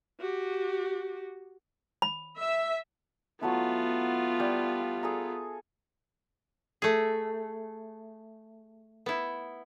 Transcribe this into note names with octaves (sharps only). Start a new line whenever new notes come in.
F#4 G4
B5
E5
F#3 A3 B3 E4 F4
G3 F5 G5
G#4 A4 A#5
A3 G#4
B3 E4